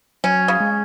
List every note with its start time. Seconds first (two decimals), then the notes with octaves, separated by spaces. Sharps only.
0.24 F#3 C#4
0.48 C#3
0.60 G#3